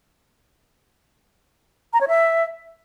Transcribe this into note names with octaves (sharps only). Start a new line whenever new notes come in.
A#5
C#5
E5